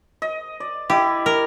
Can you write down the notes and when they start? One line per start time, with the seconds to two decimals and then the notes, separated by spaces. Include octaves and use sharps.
0.22 D#5
0.60 D5
0.90 E4 G4 D5 D#5
1.26 A#4